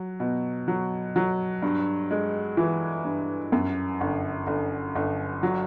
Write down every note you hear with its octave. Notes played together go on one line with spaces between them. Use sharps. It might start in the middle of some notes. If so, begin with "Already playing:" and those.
Already playing: F#3
B2
F#3
F#3
G2
G#3
E3
G2
F#2
G1
G1
G1
F#3